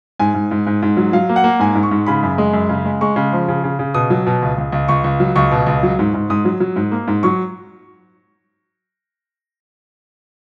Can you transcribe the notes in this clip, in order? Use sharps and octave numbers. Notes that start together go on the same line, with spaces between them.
G#2 G#5
G#2
G#2
G#2
G#2
F#3
F#3 F5
A#3
F#5
A#3
G#2 G#5
G#2
C#6
G#2
C#3 B5
F#2
G#3
F#2
C#3
G#3
G#3 C#6
C#3
F3
C#3
C#3
C#3
B2 D#6
F#3
B2
C#2
C#2
C#2
C#2 C#6
C#2
F#3
C#2 C#6
B2
C#2
F#3
G#2
G#2
G#2 D#6
F#3
F#3
G#2
A#3
G#2
F#3 C#6